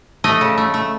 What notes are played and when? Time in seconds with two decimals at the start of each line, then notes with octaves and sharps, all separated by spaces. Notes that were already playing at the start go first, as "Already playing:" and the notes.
0.24 A3 D#5
0.41 C#3
0.58 A3
0.74 A3